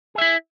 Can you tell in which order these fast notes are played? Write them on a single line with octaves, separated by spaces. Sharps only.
G#4 E5 E4